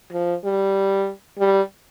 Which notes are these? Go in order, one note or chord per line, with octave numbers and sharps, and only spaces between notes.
F3
G3
G3